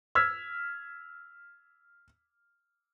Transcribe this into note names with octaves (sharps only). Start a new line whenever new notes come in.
E6 F6 G#6 B6